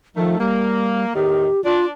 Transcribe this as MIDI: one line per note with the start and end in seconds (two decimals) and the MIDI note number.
0.16 0.38 51
0.16 0.36 53
0.16 0.38 57
0.39 1.05 55
0.39 1.12 58
1.14 1.48 40
1.14 1.48 45
1.14 1.48 51
1.14 1.63 67
1.64 1.90 62
1.64 1.85 65